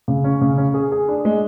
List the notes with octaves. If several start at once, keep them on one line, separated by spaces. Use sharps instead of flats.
C#3
C#4
C#3
C#4
G#4
G#4
D4
G#3